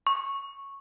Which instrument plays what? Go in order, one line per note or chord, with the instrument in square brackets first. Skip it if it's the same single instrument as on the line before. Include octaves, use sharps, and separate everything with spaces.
[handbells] C#6